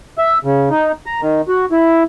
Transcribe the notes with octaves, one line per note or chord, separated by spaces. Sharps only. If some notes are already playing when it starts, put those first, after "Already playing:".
E5
C#3
D#4
A#5
D#3
F#4
E4